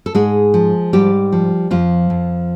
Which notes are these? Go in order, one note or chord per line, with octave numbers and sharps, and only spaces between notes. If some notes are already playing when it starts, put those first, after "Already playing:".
A4
G#2 G#3 G#4
F3
G#2 G3 G4
F3
F2 F3 F4
F2